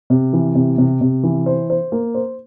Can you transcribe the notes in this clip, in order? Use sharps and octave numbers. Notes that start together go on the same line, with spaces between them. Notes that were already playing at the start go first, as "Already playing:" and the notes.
C3
E3
C3
C3
C3
E3
C5
C5
A#3
C5